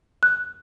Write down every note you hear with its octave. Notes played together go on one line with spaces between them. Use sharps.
F#6